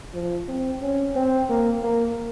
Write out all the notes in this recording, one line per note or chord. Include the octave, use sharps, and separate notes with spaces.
F3
C4
C#4
C4
A#3
A#3